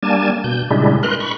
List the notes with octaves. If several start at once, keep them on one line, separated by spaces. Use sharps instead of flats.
G3 A#3 D4 G#5 A5
B2 G6
A#2 C#3 G3 G#3 D4 E4
A#4 B4 C6 F#6
B5 C#6